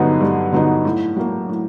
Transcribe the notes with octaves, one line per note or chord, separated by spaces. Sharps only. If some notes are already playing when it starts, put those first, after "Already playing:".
Already playing: G2 D3 F#3 B3 D#4
G2
D3 F#3 B3 D#4
A2
F#3 A#3
A2